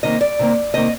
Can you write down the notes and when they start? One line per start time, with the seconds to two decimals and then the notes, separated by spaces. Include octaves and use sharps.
0.03 C3 D#3 A#3 D#5
0.21 D5
0.39 C3 D#3 A#3
0.74 C3 D#3 A#3 D#5